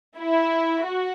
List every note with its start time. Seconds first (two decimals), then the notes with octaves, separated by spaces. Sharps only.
0.18 E4
0.85 F#4